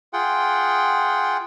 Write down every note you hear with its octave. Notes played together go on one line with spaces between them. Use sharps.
F4 G#4 F#5 G5